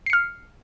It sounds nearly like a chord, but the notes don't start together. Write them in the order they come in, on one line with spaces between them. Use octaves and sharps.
C7 C#7 F6